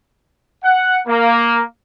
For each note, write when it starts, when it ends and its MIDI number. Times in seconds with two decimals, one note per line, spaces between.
0.64 0.99 78
1.07 1.63 58